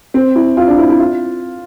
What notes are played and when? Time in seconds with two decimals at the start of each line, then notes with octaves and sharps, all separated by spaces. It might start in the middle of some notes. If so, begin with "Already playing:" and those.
0.14 C4
0.35 E4
0.57 F4
0.68 D4
0.78 E4
0.89 E4
1.00 F4